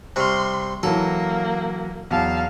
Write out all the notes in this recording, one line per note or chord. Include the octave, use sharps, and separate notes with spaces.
C3 G3 C6 C#6 F6
E3 F#3 A#3 A4
E2 F#3 F5 A5